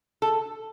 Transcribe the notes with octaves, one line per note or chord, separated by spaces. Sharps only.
A4